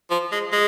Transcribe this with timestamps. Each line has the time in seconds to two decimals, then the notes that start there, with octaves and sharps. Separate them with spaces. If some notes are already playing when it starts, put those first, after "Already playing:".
0.11 F3
0.32 G#3
0.52 G#3